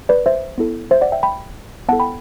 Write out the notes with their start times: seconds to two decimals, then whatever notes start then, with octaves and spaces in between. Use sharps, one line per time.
0.09 B4 D5
0.26 C5 E5
0.58 B3 E4 A4
0.91 C5 E5
1.01 D5 F#5
1.12 E5 G5
1.23 G5 B5
1.88 B3 E4 A4 F#5 A5
2.00 G5 B5